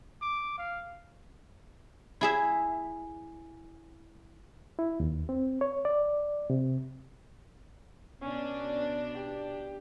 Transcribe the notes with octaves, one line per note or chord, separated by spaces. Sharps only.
D6
F5
E4 G#4 E5
E4
D#2
C4
C#5
D5
C3
B2 C#4 D4
G4